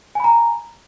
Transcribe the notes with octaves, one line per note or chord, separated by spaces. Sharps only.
G#5 A#5 B5